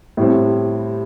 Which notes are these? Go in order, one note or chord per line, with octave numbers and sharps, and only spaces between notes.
A2 G3 C4